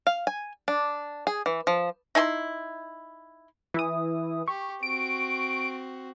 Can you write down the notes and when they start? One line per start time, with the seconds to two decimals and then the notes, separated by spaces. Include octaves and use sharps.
0.07 F5
0.27 G#5
0.68 D4
1.27 G#4
1.46 E3
1.67 F3
2.15 D#4 E4 G#5 C6
3.74 E3 E4 D#6
4.48 G4 C#6
4.83 C4 F#4 D7